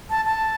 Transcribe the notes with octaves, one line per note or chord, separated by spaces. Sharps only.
A5
A5